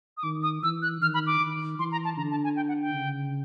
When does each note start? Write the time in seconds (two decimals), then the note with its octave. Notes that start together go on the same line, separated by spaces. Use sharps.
0.17 D#6
0.23 D#3 D6
0.43 D#6
0.63 E3 E6
0.82 F#6
1.01 D#3 F6
1.14 B5
1.27 D6
1.40 D#3
1.79 E3 C6
1.92 A#5
2.05 A5
2.17 D3 A#5
2.31 A5
2.44 G#5
2.56 G5
2.68 F#5
2.82 G5
2.94 C#3